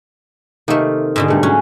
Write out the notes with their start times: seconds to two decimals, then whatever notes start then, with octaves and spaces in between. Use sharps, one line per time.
0.68 C3 D#3 A3 A#3
1.16 G#2 B2 D3
1.28 G2 A3
1.43 F#3 C#4